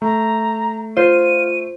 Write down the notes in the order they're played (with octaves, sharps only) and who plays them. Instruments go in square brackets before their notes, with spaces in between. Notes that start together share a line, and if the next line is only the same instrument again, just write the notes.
[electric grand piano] A3 [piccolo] A#5
[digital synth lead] F4 [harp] C5 [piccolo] D#7